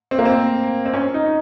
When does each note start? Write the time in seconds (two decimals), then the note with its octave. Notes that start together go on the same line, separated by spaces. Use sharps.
0.11 C4
0.19 A#3
0.25 C4
0.86 C4
0.94 C#4
1.14 D#4